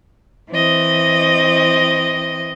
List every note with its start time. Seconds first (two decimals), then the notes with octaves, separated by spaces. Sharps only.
0.50 E3 C4 D#5